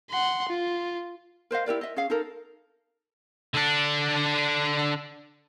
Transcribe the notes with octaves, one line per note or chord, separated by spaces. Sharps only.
F#5 C6
F4
A#4 C5 D#5 F5
E4 G4 A#4 D5
D#5 E5
C#4 G#4 F5
D#4 A4 A#4
D3 D4